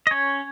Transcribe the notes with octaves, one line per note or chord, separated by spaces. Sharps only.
D#5
C#4 C#5